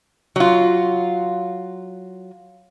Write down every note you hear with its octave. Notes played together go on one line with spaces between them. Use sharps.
F#3 F4